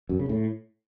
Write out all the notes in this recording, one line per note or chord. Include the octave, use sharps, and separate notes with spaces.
F#2
C#3
A2